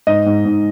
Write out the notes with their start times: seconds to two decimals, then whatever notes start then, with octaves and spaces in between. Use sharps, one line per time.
0.07 G#2 D#5
0.26 G#2
0.45 G#2